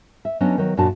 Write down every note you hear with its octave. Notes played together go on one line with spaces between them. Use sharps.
E5
F#3 B3 C#4 D4 D#5
D#3 F#3
F#2 A#2 D4 F#4 A5